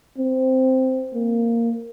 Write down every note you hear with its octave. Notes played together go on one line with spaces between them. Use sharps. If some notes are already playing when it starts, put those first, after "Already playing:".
C4
A#3